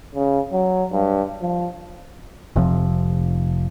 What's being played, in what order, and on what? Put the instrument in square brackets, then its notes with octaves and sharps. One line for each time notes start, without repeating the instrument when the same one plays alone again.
[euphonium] C#3
F#3
G2
F3
[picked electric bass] F1 C3 F3